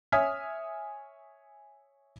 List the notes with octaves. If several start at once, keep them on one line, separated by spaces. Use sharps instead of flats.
C#5 E5 G#5 D#6 F6 B6